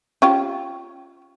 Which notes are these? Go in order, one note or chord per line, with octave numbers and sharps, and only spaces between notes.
C#4 F4 G4